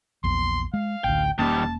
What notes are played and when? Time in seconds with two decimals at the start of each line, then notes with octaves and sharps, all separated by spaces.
0.24 A#1 E2 C6
0.74 G#3 F5
1.04 A1 D2 G5
1.38 E1 D#3 G3 A#3 C#4 A5